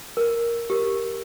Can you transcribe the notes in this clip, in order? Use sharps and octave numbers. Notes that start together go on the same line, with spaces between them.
A#4
G4 A#4